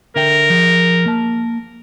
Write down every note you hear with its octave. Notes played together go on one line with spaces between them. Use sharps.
D3 A#4 E5 G5
F3 G#4
A#3 A5